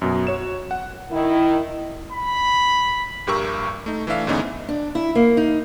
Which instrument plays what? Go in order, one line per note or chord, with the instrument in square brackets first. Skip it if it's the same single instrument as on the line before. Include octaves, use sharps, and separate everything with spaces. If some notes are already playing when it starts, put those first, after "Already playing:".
[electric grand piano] F#2 B2
F#4 C#5 E7
F#5
[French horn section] D#3 E4
[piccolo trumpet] B5
[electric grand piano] A#1 G2 G4 A#4 C#6 E6
A3 D#4
E3 A3 D4 E5 F5
G#2 D3 E3 B3 C#4 D#4
[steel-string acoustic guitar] D4
E4
A#3
D#4